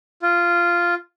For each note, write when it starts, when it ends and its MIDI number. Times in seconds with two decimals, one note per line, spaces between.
0.22 0.94 65